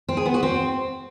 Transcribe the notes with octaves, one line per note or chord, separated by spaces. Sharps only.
C4
G#4
B3
F#4
C4